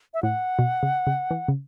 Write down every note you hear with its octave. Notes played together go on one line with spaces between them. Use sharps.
E5
A2 F#5
B2
C#3
C#3
E3
C#3